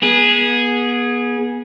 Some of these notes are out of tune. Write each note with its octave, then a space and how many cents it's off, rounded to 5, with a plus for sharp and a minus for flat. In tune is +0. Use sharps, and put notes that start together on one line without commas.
B3 -30 G#4 +0